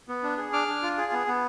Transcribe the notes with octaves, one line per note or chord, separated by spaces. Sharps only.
B3
D4
G#4
D4 D6 F6
D4
F4
G#4
B3
B3